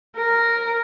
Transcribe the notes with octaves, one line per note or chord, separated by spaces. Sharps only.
A#4